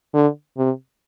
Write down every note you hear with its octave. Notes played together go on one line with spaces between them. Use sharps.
D3
C3